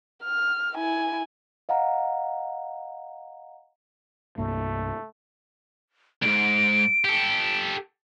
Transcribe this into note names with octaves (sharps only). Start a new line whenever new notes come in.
F6
E4 G#5
D#5 F5 F#5 A#5
C2 G2 A3 A#3
C2 G#2 D7
G4 A4